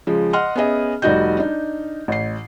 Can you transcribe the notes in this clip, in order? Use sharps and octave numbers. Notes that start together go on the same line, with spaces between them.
C#3 F3 G#3
D#5 F#5 C6 F6
B3 C#4 G#4 D#5 E5
F1 G3 D#4 F#4 D#5 G6
D4 D#4
A1 C7